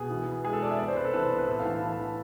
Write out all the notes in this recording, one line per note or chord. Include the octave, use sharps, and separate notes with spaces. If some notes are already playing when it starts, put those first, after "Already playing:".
Already playing: B2 G#4
E3
B3
G#3 G#4
A4
G#3 D5
E5
B3 D5
C5
C3 B4
A4
E3 B4
C5
B3
B4
A2 A4
F5
E3
A5
E3 B5
A5
E3